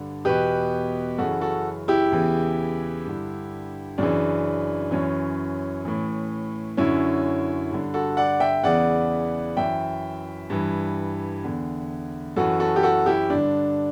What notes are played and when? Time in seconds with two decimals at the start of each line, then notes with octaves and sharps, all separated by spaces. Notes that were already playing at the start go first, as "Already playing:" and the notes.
Already playing: G2 D3
0.25 E2 B2 G4 B4
1.18 F#2 C#3 E3 F#4 A4
1.41 F#4 A4
1.88 E4 G4
2.12 E2 C#3 E3
3.06 G2 D3
3.98 F#2 C#3 E3 D4
4.91 F#2 E3 C#4
5.85 A2 E3
6.77 F#2 D3 C#4 E4
7.70 G2 D3
7.94 F#4 A4
8.17 D5 F#5
8.40 E5 G5
8.64 E2 C#3 E3 D5 F#5
9.57 F#2 E3 E5 G5
10.50 G2 E3
11.44 E2 D3
12.36 F#2 E3 F#4 A4
12.60 F#4 A4
12.76 G4
12.83 F#4 A4
13.06 E4 G4
13.30 G2 D3 D4